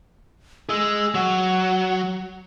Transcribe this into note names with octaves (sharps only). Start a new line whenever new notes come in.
G#4 D#5 E6
F#3 F#5